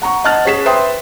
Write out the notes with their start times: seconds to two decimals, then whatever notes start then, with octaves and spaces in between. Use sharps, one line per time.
0.02 F#5 A#5 C#6
0.24 D#5 F#5 A5 F6 F#6 A6
0.45 C#4 G#4 B6 E7
0.65 B4 C5 E5 G5 C6 D#6